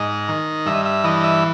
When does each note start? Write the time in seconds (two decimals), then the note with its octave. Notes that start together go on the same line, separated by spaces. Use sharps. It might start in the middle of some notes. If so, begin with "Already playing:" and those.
Already playing: G#2 D#5
0.29 D#3
0.66 G2 E5
0.85 E5
1.04 E3 D#5
1.24 E5